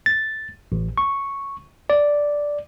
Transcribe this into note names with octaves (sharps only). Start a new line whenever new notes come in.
A6
A1
C#6
D5